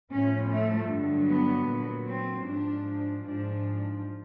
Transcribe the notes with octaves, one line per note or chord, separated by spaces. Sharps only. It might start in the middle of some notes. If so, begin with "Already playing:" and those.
A2 F3 C#4
A3
G2 D3 F#3
B3
A#2
F#3
C4
G#2 F3 D4
G#2 F3 D4